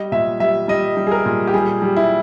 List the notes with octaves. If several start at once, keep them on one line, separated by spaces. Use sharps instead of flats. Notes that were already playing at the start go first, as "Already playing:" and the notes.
Already playing: G3 D#5
A#2 E5
G3 E5
G3 D#5
G3
G#4
A#4
A#2
G4
G3 G#4
G3
E4